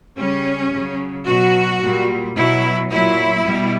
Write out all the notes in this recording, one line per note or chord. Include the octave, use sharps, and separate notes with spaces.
C#3 G3 C#4
C#3 F#3
B2 F#3 F#4
A#2 G3
B2 F#3 E4
A#2 F#3 E4
B2 G3